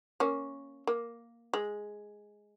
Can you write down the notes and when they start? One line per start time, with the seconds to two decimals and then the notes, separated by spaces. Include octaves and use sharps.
0.20 A#3 C#4
0.87 A#3
1.54 G#3